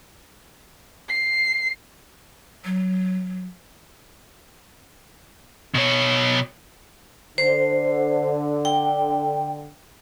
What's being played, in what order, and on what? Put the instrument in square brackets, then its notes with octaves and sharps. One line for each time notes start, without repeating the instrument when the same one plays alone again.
[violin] C7
[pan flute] F#3
[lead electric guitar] B2 C#5
[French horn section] D3 [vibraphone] C5
[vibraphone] G5